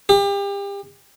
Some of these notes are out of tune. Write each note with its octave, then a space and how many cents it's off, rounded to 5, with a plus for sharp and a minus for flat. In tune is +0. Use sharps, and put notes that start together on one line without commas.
G4 +35